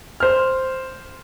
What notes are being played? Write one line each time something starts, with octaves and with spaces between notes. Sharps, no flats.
C5 F6